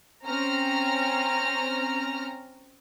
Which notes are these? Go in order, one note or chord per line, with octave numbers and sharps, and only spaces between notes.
C4 C#4 A#5 F6